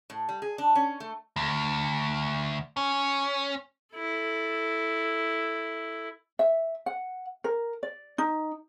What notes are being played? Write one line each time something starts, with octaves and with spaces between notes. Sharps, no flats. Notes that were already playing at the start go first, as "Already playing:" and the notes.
A2
G3
G#4
D4
C#4
A3
D2
C#4
E4 A4
E5
F#5
A#4
D5
D#4